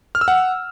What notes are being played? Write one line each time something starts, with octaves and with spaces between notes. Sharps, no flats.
F6
E6
F#5